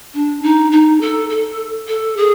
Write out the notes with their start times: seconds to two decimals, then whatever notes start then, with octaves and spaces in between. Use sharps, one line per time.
0.14 D4
0.43 D#4
0.72 D#4
1.01 A4
1.29 A4
1.88 A4
2.17 G#4